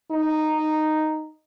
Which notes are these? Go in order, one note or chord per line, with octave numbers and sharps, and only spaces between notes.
D#4